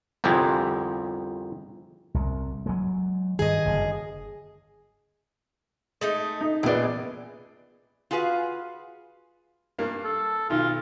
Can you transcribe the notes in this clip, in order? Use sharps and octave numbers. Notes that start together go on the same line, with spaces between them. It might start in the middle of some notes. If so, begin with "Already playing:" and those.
G1 C2 F2 G4 G#4
C2
F#3 G#3
G2 D#3 G#4 D#5
F#1 F#2 D3
G#3 A3 D#4
D#4
A#1 E3 G#3 B3 D5
F4 F#4 G#4 B4 F5
G2 A#3
A4
B1 D#3 F4